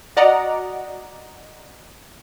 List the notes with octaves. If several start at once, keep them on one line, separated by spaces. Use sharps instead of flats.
F#4 D5 D#5 F#5 A#5